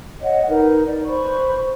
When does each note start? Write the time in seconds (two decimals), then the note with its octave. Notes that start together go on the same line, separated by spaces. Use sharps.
0.21 C#5 D#5 F#5
0.48 D#4 A#4 B4
0.86 D5
1.06 B4 C5 B5 C#6